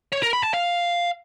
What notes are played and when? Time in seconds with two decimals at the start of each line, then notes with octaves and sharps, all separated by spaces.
0.12 C#5
0.23 A#4
0.33 B5
0.43 A5
0.54 F5